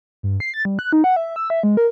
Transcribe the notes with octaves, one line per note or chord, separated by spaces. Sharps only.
G2
C7
A6
G3
F#6
D#4
F#5
E5
E6
E5
G#3
A#4